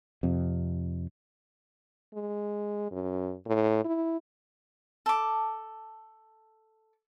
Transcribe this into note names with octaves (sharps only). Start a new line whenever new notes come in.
F2 C3
G#3
F#2
A2
E4
A4 D6